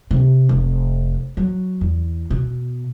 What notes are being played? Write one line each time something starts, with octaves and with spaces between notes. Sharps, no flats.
C3
F1
F#3
E2
B2